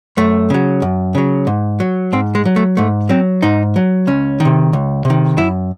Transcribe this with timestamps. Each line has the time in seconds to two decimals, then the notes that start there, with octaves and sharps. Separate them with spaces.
0.17 F#2 A3
0.50 C#3 F#3
0.82 F#2
1.15 C#3 F#3
1.47 G#2
1.80 F#3
2.13 G#2 C4
2.35 G#3
2.45 F#3
2.56 A3
2.77 G#2 A3
3.09 F#3 C4
3.42 G#2 D#4
3.76 F#3
4.07 C#2 C#4
4.40 D#3
4.45 C3
4.73 C#2
5.05 C3
5.10 D#3
5.37 F#2 E4